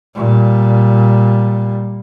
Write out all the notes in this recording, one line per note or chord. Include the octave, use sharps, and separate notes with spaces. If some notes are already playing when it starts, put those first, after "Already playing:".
A#2 G3